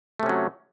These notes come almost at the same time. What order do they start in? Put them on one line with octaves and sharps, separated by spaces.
A3 C3 C#4 F#3